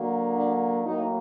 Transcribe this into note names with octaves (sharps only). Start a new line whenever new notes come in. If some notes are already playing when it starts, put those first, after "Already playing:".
Already playing: D3 F#3 A#3
D4
A2 F#3 A#3 D#4